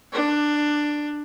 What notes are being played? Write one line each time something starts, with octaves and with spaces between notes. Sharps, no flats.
D4